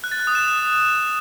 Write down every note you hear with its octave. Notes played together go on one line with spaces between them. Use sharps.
F#6
A6
F#6
D#6
E7